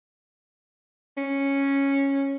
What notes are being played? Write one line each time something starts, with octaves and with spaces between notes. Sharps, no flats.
C#4